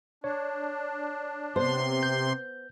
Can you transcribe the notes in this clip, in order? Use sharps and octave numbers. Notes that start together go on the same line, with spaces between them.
D4 C#5
C3 B3 C5 C6
G6